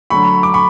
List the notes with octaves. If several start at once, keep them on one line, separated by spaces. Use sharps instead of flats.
D3 F#3 A3 B5 C#6
D6
B5 C#6